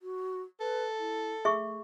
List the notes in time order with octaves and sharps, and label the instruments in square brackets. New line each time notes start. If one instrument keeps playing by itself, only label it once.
[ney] F#4
[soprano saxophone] A4 [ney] B4
[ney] E4
[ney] A3 [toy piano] G#4 E5 C#6